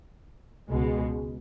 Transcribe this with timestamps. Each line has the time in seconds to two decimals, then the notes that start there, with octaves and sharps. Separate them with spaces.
0.70 C#2 B2 G#3